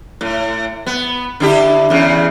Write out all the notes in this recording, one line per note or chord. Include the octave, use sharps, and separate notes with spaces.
A2
B3
D3 E4 G4
E2 C#3